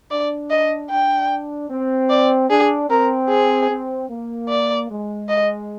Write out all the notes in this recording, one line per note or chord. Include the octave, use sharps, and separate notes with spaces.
D4 D5
D#5
D4 G5
C4
D5
D4 G#4
C4 A#4
G#4
C4
A#3
D5
G#3
D#5